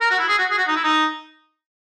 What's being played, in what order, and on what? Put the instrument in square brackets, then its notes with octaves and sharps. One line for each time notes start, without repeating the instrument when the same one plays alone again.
[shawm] A#4
F#4
E4
G#4
F#4
G#4
F#4
D#4
E4
D#4